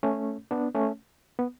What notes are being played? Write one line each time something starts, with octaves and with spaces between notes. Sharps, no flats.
A3 C#4
B3 D4
A3 C#4
B3